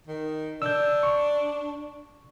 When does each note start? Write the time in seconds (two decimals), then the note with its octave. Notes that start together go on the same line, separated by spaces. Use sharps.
0.07 D#3
0.62 D4 E6 G6
1.03 C#6